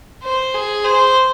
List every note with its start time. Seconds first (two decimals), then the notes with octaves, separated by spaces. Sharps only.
0.23 C5
0.54 G#4
0.84 C5